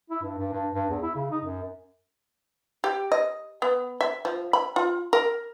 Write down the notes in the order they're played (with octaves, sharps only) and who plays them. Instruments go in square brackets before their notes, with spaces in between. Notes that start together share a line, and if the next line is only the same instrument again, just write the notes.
[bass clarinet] E4
G2
G2
G2
G2
E2
E4
C#3
D#4
F#2
[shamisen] G4
D#5
B3
E5
F3
B5
F4
A#4